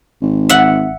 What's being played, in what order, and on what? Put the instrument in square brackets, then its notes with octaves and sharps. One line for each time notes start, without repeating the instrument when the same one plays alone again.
[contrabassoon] G#1
[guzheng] E5 F#5